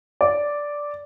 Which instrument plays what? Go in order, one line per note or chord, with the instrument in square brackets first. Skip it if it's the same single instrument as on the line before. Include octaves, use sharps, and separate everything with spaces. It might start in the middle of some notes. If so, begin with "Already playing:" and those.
[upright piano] D5